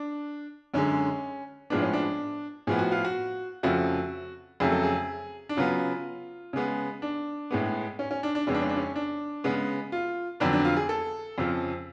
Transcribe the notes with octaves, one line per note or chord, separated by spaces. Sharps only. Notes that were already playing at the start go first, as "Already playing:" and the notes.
Already playing: D4
F#2 D3 G#3 C#4
A2 F3 G#3 B3 D4
C#4
D4
A2 F3 B3 G#4
F#4
F4
F#4
F2 C#3 F3 A3 F#4
F2 C#3 F#3 A3 G#4
A4
G#4
D4
C#3 F#3 B3 F4
C#3 G#3 B3
D4
A2 G#3 B3
C#4
C#4
D4
D4
F2 C#3 G#3 B3 C#4
D4
C#4
D4
C#4
D4
C#3 G#3 B3
F4
F2 D3 F#3 B3 D4
D4
F4
G#4
A4
F2 C#3 F3